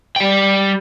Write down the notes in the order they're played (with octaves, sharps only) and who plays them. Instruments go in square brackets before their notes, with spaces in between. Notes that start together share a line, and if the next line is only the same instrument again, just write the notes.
[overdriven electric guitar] G3 G5